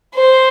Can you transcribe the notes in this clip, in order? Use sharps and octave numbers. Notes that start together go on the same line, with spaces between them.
C5